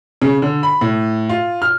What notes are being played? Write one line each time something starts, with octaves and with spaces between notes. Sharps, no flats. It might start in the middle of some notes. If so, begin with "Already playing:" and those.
C#3
D3
B5
A2
F4
F6